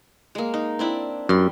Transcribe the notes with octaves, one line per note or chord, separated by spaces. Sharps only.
G#3 A#3
D#4
C4 D4 E4
F#2 G3 C6